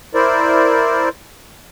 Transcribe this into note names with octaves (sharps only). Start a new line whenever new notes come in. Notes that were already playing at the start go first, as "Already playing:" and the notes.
E4 A#4 C5 D5